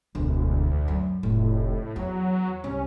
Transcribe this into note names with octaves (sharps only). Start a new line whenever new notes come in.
E1 D2
F#2
F1 A2
E2 F#3
C2 C#4